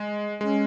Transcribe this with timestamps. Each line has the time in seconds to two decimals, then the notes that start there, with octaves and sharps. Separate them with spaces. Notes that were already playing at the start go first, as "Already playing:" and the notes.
Already playing: G#3
0.41 G#3 C#4